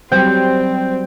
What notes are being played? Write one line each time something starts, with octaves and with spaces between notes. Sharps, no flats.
F#3 G3 C4 C5 G5